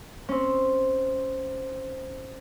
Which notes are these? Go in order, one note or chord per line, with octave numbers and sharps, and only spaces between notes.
C4 C#4